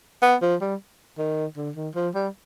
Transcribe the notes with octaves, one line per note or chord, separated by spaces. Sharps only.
B3
F3
G3
D#3
D3
D#3
F3
G3